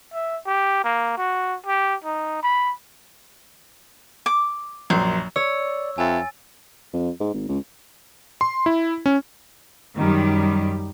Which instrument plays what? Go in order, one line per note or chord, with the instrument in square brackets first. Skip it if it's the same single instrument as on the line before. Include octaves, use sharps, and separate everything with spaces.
[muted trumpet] E5
G4
A#3
F#4
G4
D#4
B5
[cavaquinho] D6
[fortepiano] A#1 F#2 [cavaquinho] C5
[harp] C#5 [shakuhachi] D5 [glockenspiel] E6
[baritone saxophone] F2 [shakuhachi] E5 [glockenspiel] G#5 A6
[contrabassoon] F2
G#2
G#1
C#2
[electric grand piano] C6
E4
C#4
[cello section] F#2 D#3 G3